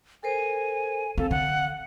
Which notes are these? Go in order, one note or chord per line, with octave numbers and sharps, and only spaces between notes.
A4 A#4 C5 G#5
C4 A4 F5
D3 F#5